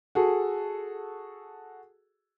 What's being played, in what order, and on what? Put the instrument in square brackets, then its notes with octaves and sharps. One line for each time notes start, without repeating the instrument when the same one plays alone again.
[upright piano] F#4 G#4 A4